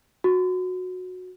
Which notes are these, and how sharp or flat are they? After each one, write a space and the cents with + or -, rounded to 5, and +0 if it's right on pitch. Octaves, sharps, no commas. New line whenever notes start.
F#4 -15